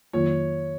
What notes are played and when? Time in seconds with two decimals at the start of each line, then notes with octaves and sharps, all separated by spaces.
0.13 F2 D#3 F#3 A#3 F4 C#5